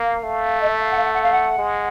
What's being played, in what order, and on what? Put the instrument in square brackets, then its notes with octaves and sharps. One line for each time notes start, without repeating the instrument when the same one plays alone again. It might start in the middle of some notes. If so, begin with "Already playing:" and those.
Already playing: [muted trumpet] A#3 [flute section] F5
[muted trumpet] A3
[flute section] D#5
E5
F5
F#5
F5
F#5
F#5
F5
F#5
[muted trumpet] G#3